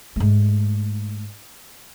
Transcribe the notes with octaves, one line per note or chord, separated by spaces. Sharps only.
G#2 A3